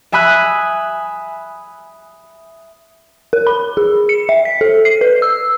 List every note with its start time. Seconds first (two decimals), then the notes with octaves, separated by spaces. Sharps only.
0.12 E5 G#5 B5 D#6 F#6
3.33 A#4
3.47 B5
3.77 G#4
4.09 C#7
4.29 E5
4.45 B6
4.61 A4
4.85 C7
5.01 B4
5.22 E6